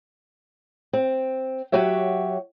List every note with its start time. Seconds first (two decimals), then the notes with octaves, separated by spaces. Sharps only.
0.93 C4
1.72 F#3 F#4 G4 C#5 E5